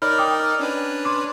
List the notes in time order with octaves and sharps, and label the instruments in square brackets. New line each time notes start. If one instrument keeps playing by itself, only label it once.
[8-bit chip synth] D#4 A#4 D5 [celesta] C#5 B5 F6
[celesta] G5 D6 D#6
F6
[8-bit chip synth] C#4 D4 B4
[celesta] C6 D6